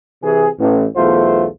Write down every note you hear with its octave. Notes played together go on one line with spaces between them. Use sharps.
C3 E3 G#4
A1
B1 E2 A3 F4 C5